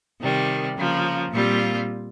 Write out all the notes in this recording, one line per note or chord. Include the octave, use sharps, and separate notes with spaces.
C3 D#3 G3
C#3 F3 A#3
A#2 G3 C4 F4